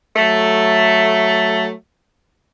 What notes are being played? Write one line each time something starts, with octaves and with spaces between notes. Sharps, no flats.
F#3 A3